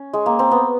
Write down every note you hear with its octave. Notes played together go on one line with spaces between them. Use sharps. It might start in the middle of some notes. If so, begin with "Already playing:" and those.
Already playing: C#4
G#3
A#3
C4
B3